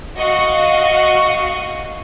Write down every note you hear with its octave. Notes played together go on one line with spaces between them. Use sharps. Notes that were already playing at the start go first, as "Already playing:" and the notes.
F#4 D#5 F5 F#5 C#6